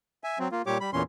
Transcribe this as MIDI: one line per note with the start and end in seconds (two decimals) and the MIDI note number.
0.24 0.38 76
0.24 0.38 80
0.39 0.48 54
0.39 0.48 60
0.52 0.62 58
0.52 0.62 65
0.66 0.78 46
0.66 0.78 55
0.66 0.78 67
0.66 0.78 73
0.66 0.78 86
0.81 0.91 55
0.81 0.91 83
0.93 1.03 40
0.93 1.03 46
0.93 1.03 52
0.93 1.03 61
0.93 1.03 84